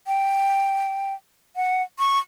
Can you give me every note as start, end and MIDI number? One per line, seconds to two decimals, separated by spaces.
0.07 1.14 79
1.56 1.82 78
1.99 2.19 85